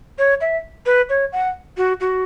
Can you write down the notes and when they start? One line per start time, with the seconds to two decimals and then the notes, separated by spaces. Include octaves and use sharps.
0.18 C#5
0.41 E5
0.86 B4
1.09 C#5
1.32 F#5
1.77 F#4
2.00 F#4